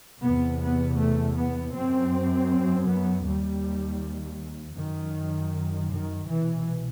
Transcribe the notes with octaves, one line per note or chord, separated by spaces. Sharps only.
E2 C3 B3
B3
A3
B3
F#2 C4
B3
D#2 G3
F#2 D#3
D#3
C2 B2 E3